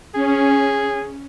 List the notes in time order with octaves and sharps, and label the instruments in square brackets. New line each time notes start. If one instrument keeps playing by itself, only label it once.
[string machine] C#4 [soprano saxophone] G#4